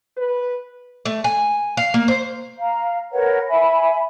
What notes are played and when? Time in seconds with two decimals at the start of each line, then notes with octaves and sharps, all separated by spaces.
0.17 B4
1.05 A3
1.24 G#5
1.77 F5
1.94 A#3
2.08 C5
2.58 F5 A#5
3.13 A#4 B4 C#5 F#5
3.49 E5 G#5 B5